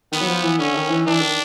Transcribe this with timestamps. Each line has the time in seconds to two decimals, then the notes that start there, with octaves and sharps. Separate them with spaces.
0.12 D#3 B3
0.22 F#3
0.28 F3
0.44 E3
0.59 D3 C#4
0.75 D#3
0.90 E3
1.06 E3 D4
1.21 D#3